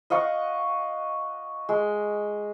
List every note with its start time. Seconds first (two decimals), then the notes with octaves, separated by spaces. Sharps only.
0.10 D#5 F5 F#5 C#6
1.69 G#3